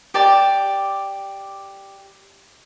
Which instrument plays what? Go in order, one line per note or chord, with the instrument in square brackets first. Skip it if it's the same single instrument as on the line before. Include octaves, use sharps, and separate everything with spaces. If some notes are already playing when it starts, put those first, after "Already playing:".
[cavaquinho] G4 D5 A5